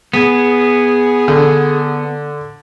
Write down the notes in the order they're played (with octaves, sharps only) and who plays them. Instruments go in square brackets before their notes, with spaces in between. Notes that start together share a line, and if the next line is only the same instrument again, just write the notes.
[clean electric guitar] B3 [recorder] G#4
[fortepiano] D3